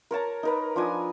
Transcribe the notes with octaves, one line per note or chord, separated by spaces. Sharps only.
A#4 C#5 A5 A#5
D#4 A#4 B4
F3 D4 G#5 D#6